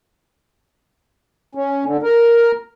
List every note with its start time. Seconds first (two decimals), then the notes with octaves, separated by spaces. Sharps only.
1.55 C#4
1.84 D3
2.03 A#4